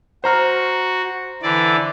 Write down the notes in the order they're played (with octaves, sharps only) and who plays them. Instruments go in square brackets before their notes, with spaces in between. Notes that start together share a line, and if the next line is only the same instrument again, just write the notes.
[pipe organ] F#4 [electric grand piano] C5 A#5 F6
[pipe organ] D3 E3 D5